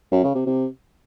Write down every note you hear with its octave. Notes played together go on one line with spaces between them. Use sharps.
F#2
C#3
C3
C3